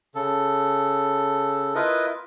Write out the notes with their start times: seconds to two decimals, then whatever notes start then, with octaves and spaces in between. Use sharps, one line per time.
0.15 C#3 A4
1.75 E4 F4 A#4 B4 D#5